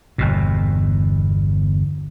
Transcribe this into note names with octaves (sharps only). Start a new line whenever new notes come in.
G1 E2 B2